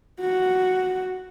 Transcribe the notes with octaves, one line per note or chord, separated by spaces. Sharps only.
F#4